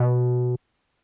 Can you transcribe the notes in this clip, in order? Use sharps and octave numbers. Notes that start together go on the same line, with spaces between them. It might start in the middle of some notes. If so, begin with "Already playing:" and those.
Already playing: B2